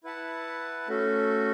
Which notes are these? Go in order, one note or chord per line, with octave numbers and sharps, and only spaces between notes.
E4 B4 F#5 A5
A3 C#4 F#4 A4